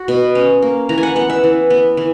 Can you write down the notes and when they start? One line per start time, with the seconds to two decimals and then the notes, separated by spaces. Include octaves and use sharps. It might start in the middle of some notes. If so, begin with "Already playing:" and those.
Already playing: F#4
0.08 B2
0.35 C#4
0.62 A#3
0.89 E3 A#5
0.98 G#5
1.03 F#5
1.16 B3 F#5
1.30 E5
1.44 E3
1.70 B3
1.97 E3